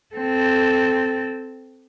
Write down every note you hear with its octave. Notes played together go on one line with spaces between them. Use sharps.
C4 A4